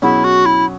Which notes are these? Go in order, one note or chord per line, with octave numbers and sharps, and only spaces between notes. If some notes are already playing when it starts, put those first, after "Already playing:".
B2 F#3 C#4 E4 G#4
F#4
E4